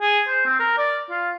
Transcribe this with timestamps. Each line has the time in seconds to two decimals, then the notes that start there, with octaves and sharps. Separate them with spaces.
0.01 G#4
0.27 C5
0.45 C4
0.59 A#4
0.78 D5
1.10 F4